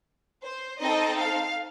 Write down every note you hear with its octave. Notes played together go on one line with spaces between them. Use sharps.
C5
C4 D#4 A4 D#5
F5